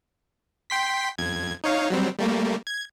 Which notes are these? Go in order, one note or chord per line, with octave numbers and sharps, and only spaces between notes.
G5 C6 B6
F2 G#6
D#4 C#5 F5
F#3 G3 C4
G3 A3 A#3
G#6